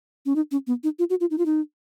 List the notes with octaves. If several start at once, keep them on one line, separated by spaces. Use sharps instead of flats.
C#4
D#4
C#4
B3
D#4
F4
F#4
F4
D#4
F4
D#4